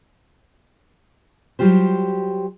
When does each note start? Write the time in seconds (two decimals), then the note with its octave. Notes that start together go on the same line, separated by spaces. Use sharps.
1.59 F#3 G3 F4 G4 C5